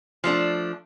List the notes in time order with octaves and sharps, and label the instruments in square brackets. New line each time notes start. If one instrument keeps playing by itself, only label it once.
[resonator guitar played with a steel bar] F3 A3 D4